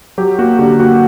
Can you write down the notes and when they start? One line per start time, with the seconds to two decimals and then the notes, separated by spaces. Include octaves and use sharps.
0.18 F#3 G4
0.39 A#3 F#4
0.59 D3 G4
0.80 A#3 F#4